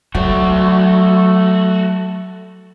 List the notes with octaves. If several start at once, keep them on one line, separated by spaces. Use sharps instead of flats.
F#3 A3 F#4